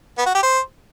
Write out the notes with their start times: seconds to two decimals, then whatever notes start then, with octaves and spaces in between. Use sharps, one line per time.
0.18 B3
0.26 F#4
0.35 G4
0.43 C5